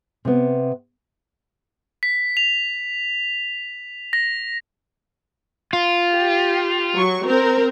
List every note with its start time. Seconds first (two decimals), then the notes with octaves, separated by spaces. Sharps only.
0.25 C3 B3
2.03 B6
2.37 F7
4.13 A#6
5.73 F4
6.11 G4
6.95 F#3 C#6
7.25 C4 A#4